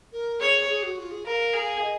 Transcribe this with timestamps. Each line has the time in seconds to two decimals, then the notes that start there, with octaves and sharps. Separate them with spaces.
0.12 A#4
0.40 G#4 C#5
0.69 G#4
0.83 F#4
0.98 F4
1.11 G#4
1.26 A#4 F5
1.54 G#4
1.82 D#5